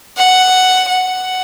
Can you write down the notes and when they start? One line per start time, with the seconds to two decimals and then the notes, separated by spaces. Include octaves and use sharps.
0.17 F#5
0.89 F#5